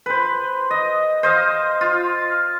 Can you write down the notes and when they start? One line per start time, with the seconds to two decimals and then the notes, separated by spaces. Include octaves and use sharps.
0.06 B4 C5
0.71 D#5
1.23 C5 D#5 F5
1.81 F4